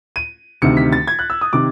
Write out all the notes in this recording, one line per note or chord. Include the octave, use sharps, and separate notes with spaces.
D#7
D2 C3 D#3 C#7
B6
A6
G#6
F#6
E6
D#6
C3 D#3 D6